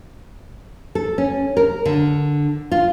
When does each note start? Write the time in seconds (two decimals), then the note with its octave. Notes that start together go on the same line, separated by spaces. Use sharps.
0.95 A4
1.18 C#4
1.57 A#4
1.85 D3
2.71 F4